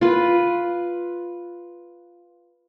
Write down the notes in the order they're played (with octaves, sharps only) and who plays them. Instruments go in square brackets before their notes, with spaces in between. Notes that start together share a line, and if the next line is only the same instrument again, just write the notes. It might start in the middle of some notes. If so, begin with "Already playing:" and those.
[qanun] F4 B4